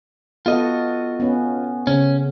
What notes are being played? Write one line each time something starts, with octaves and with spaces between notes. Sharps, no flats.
B3 F4 F#4 A4 D#5
B3 C#4
C#3 C#4